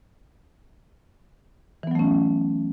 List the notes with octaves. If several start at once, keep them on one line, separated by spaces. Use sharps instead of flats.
E3 F#3 A3 B3 C#4